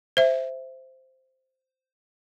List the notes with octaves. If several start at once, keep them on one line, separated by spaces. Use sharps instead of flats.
C5 E5